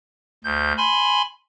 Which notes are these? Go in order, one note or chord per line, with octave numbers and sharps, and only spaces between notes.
D2 G6
G#5 B5 C6